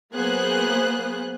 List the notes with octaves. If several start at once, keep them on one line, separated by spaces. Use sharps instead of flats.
F#3 A#3 B3 G#4 C5 F#6